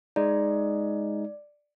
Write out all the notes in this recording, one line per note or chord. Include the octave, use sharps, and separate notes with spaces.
G#3 D#4 D5